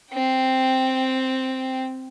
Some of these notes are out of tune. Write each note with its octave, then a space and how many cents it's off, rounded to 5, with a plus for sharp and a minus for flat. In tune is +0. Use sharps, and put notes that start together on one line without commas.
C4 +0 G5 +0